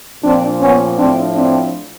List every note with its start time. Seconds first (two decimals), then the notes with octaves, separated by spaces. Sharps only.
0.24 A#2 F3 C4 D4
0.61 B3 C#4
0.98 A2 F3 C4 D4
1.36 C4 D4